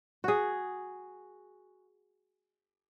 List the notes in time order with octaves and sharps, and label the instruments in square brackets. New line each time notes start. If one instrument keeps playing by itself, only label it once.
[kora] F#4 G#4